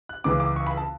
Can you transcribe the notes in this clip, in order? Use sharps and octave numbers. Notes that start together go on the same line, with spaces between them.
F#6
C#2 C#3 E3 D6
D6
C#6
B5
A5